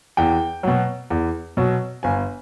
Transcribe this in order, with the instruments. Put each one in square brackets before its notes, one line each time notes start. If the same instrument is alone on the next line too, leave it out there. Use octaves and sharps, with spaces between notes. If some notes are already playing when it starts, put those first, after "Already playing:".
[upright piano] E2 G5
B2 F#3
E2
B2 F#3
G1 G#5